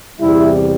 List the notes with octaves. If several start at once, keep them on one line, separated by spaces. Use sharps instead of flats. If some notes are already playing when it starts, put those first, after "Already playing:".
E2 C3 G3 E4